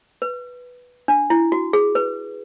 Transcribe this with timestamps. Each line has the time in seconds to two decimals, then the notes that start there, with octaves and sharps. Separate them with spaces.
0.22 B4
1.08 D4
1.30 E4
1.52 F#4
1.73 G#4
1.95 B4